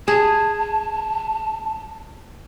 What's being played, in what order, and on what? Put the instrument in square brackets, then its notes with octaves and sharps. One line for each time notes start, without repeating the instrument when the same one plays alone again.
[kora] G#4 [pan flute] A5